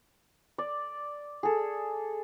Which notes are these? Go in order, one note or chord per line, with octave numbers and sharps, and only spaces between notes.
D5
G#4 A4